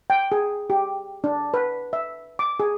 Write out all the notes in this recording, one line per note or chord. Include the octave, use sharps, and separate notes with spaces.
G5
G#4
G4
D4
B4
E5
D6
G#4